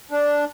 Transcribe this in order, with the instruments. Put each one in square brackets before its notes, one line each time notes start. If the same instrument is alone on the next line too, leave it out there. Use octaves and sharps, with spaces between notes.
[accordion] D4